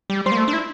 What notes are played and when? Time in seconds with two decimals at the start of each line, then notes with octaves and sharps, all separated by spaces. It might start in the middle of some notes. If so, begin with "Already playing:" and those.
0.10 G3
0.26 G3 C5 C6
0.32 A#3
0.37 A3
0.48 D4
0.53 E4